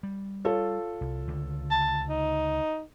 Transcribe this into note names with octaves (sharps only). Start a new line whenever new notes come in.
G3
F4 A4 C#5
C2
C#2 D3
A5
D#4